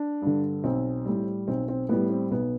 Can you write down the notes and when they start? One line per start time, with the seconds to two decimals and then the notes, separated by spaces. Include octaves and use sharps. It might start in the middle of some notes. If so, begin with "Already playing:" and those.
Already playing: D4
0.22 G2 D3
0.64 B1 C4
1.05 A2 G3
1.48 B1 C4
1.68 C4
1.89 A2 G3 B3
2.10 C4
2.31 B1 B3